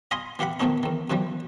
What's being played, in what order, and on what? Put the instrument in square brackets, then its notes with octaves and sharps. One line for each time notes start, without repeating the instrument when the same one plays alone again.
[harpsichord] D#5 F5 G#5 B5 C6
E3 G4 F5 F#5 B5
D#3 F3 A3 B3 C#4 D#4
E2 D#3
F#2 B2 E3 F3 G3